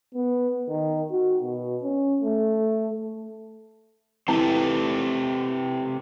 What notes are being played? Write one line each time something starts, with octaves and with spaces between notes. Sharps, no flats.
B3
D#3
F#4
B2
C#4
A3
E3 C4 G4 A4 A5